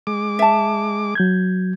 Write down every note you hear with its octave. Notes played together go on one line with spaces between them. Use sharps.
G#3 D6
E5 A5
F#3 G6 G#6